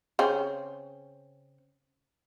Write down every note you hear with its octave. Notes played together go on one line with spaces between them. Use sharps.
C#3 C4 C#4